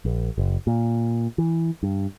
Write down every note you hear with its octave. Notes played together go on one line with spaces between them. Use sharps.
A#1
F#1
A#2
E3
G2